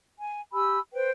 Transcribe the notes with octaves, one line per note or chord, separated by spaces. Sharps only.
G#5
G4 G#5 B5 E6
B4 C5 G5